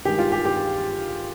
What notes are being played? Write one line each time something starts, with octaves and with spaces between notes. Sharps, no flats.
G2 D#3 G#3 G4
F4
G4
G4